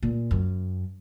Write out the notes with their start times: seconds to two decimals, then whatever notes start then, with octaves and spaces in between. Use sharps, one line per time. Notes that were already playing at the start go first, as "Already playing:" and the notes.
0.03 A#2
0.31 F#2